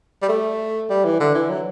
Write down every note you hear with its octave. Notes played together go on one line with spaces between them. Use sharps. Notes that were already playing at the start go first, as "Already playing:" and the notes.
G3
A3
G3
E3
D3
E3
F#3